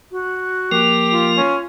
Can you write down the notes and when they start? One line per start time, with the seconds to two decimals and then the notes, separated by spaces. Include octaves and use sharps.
0.12 F#4
0.72 F3 A#3 G4 A#4
1.11 F4
1.37 C#4